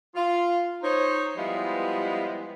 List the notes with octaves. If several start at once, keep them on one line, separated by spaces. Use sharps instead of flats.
F4
D#4 C5 C#5
F3 G3 G#3 B3 E4 F4